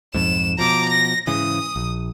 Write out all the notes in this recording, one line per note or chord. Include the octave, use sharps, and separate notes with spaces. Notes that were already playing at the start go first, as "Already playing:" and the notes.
B1 F2 G#2 E7
B2 F3 A#5 D6
A#6
G#2 C#3 E3 D#6
A#1